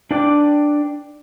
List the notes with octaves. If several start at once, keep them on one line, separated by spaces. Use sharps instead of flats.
D4 B4 D5 G5 D6